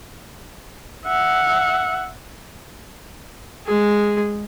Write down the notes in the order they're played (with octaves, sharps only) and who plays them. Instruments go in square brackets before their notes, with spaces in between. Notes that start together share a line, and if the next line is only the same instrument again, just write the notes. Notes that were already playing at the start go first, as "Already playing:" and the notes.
[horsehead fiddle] E5 F#5
[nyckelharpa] G#3 G#4